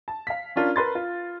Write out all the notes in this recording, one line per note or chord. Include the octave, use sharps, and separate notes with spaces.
A5
F5 B6
C#4 D4 F4 A#4
A#4 B4 C6 A6
F4